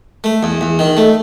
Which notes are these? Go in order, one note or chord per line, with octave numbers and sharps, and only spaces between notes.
A3
E2
E2
D#3
A3